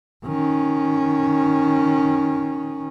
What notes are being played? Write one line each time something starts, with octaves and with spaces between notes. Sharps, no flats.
D#3 C#4